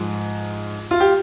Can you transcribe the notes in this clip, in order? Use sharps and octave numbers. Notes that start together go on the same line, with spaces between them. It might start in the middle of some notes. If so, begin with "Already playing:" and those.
Already playing: G#2 F3
F4
G4